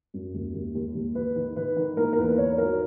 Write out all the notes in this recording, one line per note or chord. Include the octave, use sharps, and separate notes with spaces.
F#2
D#2
D#2
D#2
D#2
D#3 B4
D#3
D#3 B4
D#3
A#3 A#4
A#4
E2 B4
D#3 C#5
F#3 A#4